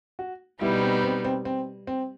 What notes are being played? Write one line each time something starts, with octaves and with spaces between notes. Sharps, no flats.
F#4
B2 G3 B3 D#4 E4
C4
C4
C4
C4
C4